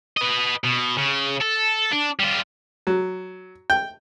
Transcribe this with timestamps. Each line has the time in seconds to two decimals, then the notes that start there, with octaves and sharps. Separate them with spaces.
0.17 B4 D#5
0.64 B2
0.98 C#3
1.42 A4
1.92 D4
2.20 G3 F4
2.87 F#3
3.70 G5